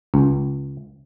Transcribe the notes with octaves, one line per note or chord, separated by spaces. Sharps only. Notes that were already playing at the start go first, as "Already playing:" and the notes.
C#2